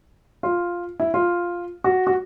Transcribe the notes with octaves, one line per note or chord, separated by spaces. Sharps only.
F4
E4
F4
F#4
F#4